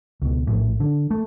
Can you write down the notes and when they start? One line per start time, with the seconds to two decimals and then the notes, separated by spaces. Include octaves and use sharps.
0.22 C#2 B2
0.47 A#1 A2
0.80 D3
1.11 A3